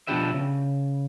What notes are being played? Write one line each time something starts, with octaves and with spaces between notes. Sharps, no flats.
B2 F3 D4 G4 B4 E5
C#3